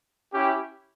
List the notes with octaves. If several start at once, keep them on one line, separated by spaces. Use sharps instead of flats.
C#4 E4 G4